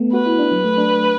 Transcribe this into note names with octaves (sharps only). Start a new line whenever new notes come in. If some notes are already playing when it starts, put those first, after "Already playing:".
Already playing: A3 B3
F#4 B4
E4
D4
F#3
A3
D4